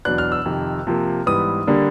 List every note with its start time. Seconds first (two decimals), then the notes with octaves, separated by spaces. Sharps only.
0.05 E2 B2 F#3 B3 D4 F#6
0.18 F6
0.32 E6
0.45 F2 C3 D#3
0.87 C3 F3 A#3
1.26 G#2 E3 G3 B3 D#6
1.67 D3 G3 A#3 D4